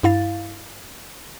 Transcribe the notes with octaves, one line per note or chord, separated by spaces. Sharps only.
G2 E4 F5 A6